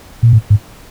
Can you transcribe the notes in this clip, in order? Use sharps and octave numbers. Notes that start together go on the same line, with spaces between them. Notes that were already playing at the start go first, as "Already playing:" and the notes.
A#2
A2
G#2